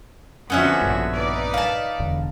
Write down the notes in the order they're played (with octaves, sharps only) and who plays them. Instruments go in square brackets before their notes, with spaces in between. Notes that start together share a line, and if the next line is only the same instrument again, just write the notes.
[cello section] F2 D3 F#4 [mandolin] B3 C#4 E5
[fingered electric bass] A#1 G2
[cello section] D#4 B4 D5
[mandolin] F5 A5
[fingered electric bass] E1 E2 D3